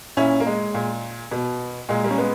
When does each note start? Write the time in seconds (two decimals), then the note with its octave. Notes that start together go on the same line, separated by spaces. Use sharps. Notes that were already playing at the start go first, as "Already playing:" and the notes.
0.17 A#2 C#4 E4
0.40 A#3
0.46 G#3
0.74 A#2
1.32 B2
1.89 A#2 G#3
2.03 G3 A#3
2.11 C#4
2.18 G#3 B3